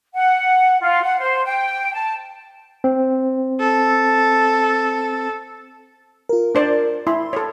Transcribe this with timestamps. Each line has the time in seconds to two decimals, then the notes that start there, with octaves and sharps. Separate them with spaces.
0.15 F#5
0.82 F4
1.02 F#5
1.19 C5
1.45 G5
1.94 A5
2.84 C4
3.60 A4
6.29 F4 A#4
6.55 D4 C5 D5
7.07 E4 C6
7.33 A4 C#5